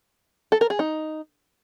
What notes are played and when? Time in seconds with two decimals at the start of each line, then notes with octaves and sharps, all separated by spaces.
0.52 A4
0.61 A#4
0.70 G#4
0.79 D#4